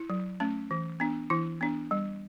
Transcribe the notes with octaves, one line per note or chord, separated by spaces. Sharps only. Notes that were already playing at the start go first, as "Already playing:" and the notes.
Already playing: E4
F#3
A3 C#4
E3
B3 D4
E3 E4
B3 D4
G3